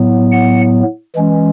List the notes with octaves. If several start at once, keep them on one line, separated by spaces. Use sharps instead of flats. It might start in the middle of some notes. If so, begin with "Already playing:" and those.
Already playing: A2 F#3 B3
F#5
E3 G#3 C#4